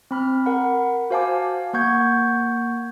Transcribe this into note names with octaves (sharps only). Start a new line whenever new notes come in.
C4 B5 F6
A#4 F#5 B5
F#4 C5 F5 G#5 A5 D6
A#3 F#5 C#6 G6 G#6